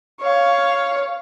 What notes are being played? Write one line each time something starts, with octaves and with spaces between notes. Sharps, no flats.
C#5 F5